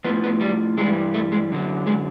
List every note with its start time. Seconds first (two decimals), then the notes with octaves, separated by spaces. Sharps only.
0.04 A2 F3 B3
0.23 B3
0.41 G3
0.77 G2 E3 G3 G#3
1.14 A3
1.32 G#3
1.50 F#2 D3 F#3
1.87 G#3